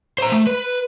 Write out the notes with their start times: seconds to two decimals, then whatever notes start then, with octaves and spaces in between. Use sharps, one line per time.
0.18 C5 A#5
0.32 A3
0.47 B4